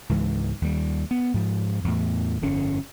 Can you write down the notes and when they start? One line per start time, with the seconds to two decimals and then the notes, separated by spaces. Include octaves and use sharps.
0.09 C#2 G#2 E3
0.62 D#2 G3
1.11 B3
1.34 G#2 F3
1.84 E2 A2
2.42 G1 F2 D3 C#4